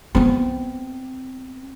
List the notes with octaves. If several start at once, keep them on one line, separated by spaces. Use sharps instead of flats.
B3 C4